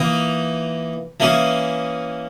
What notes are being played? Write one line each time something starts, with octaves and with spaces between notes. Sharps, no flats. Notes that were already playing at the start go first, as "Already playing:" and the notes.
Already playing: E3 A#3 D#4 A#4
E3 A#3 C#4 G#4